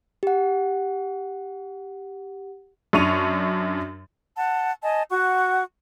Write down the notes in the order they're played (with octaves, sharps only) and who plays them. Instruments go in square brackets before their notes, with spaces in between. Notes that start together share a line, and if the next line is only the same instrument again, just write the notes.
[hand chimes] G4 F#5
[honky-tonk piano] F#2 D4 C#6 D#7 F7
[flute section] F#5 A5
D#5 G#5 A5
F#4 F#5 C#6